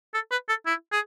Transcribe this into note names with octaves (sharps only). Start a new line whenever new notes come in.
A4
B4
A4
E4
G#4